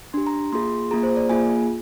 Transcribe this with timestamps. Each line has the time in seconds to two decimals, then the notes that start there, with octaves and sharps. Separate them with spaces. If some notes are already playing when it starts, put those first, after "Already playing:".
0.13 D4 G4 C6
0.27 A#5
0.52 A#3 F4 G#4 C6
0.91 A#3 F4 G#4 A#5
1.03 C5
1.16 D5
1.29 A#3 F4 G#4 G#5